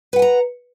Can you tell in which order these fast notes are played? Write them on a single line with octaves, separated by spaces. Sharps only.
B4 F#5 G#5 A#5